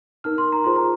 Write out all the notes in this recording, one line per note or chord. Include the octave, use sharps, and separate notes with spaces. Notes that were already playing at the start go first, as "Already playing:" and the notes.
D#4 A#4 F6
C6
A#5
F4 G#4 C5 C6
A#5